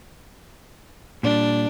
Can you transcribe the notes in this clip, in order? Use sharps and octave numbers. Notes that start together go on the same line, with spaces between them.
A#2 G3 D4